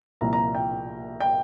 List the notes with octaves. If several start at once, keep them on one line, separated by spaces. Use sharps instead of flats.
C2 A#2 F3 A#5
A#5
G5
G5